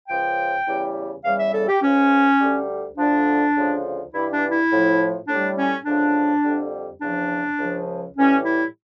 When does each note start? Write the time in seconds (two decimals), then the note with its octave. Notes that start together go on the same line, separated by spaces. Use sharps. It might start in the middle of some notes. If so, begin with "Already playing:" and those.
0.08 C#2 C#3 F3 G5
0.67 E2 C#3 E3 G3
1.24 E2 C#3 E3 G3 F5
1.39 E5
1.53 A4
1.68 G4
1.82 C#2 C#3 F3 C#4
2.40 D2 D3 G3
2.97 D2 D3 F3 D4
3.56 D2 C#3 F3
4.13 G2 E3 G3 E4
4.32 D4
4.51 E4
4.71 A2 F3
5.28 A2 G3 D4
5.57 C#4
5.86 D2 C#3 F3 D4
6.43 F2 D3 G3
7.01 E2 C#3 F3 D4
7.59 C#2 C#3 F3
8.17 A2 E3 G3 C#4
8.45 E4